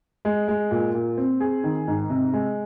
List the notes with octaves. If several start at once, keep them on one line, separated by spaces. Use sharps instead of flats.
G#3
G#3
A#2
A#2
C4
G#4
D#3
G#2
C3
G#3